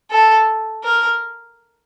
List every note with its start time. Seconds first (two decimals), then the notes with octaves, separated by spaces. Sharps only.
0.11 A4
0.84 A#4